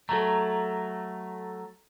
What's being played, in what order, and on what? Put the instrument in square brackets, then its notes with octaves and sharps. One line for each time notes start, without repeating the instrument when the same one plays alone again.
[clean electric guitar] F#3 A3 [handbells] A4 A#5